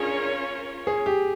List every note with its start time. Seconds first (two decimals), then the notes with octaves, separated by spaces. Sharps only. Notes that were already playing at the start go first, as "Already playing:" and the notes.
Already playing: C#4 D4 F4 G#4 A#4 C#5
0.87 G#4
1.06 G4